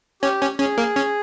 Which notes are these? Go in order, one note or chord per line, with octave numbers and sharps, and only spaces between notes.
C#4 G4
C#4
C#4 G#4
A#3
C#4